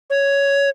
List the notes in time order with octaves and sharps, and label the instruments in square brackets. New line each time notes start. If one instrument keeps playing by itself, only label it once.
[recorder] C#5